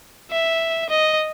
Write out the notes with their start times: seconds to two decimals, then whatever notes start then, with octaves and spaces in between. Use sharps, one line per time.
0.31 E5
0.90 D#5